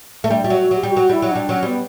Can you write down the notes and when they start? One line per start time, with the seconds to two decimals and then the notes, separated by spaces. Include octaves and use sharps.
0.24 A3
0.30 G3 D4
0.44 G3 F#4
0.50 F#3
0.61 F#4
0.71 F#3 G4
0.83 G3
0.91 F#4
0.97 F#3
1.09 G3 E4
1.22 F#3
1.31 G3 D4
1.49 F#3 C#4
1.63 G3 B3